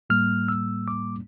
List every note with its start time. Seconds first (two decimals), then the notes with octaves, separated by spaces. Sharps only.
0.10 A2 G3 A#3 F6
0.48 E6
0.88 D6